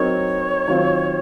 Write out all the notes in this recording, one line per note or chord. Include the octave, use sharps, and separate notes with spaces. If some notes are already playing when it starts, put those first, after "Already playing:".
Already playing: F#3 C4 D#4 A#4 C#5
D#3 F#3 C4 F4